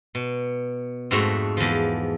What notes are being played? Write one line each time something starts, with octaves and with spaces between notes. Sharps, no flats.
B2
F2 G#2 A3 F#4 E5
E2 F3